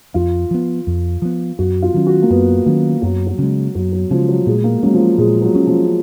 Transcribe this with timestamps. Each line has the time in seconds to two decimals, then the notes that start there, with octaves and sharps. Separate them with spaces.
0.14 F2 F4
0.51 F3 B3
0.87 F2
1.22 F3 B3
1.59 F#2 F#4
1.82 F4
1.94 D#3 F#3 C#4
2.07 F#4
2.22 A#3
2.30 F#2 B3
2.66 D#3 F#3 A#3 C#4
3.02 F#2 F#3
3.27 F#3
3.38 C#3 G#3
3.75 F#2 F#3
3.92 F#3
4.11 C#3 F3 G#3
4.29 F#3
4.46 A#2 G#3
4.64 A#3
4.83 F#3 G#3 C#4
4.94 F3
5.00 F#3
5.18 A#2 G#3
5.42 F#3
5.55 G#3 C#4
5.67 F3